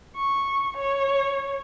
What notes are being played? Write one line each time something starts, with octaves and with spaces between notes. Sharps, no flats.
C#6
C#5